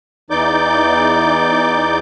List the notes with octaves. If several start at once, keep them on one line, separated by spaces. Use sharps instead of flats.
E2 E3 D#4 D5 D6 G6